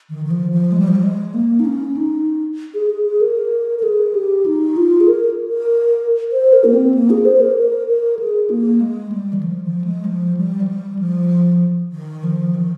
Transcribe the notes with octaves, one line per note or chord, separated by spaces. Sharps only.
D#3
D#3
F3
F3
G#3
G3
F3
G3
G#3
A#3
D#4
C#4
D#4
G#4
G#4
G#4
A#4
A#4
G#4
G4
D#4
F4
G#4
A#4
A#4
C5
A#4
A#3
C4
A#3
G#4
C5
A#4
A#4
A#4
G#4
A#3
G#3
G3
D#3
F3
F3
G#3
F3
G3
F3
G3
F3
D#3
F3
D#3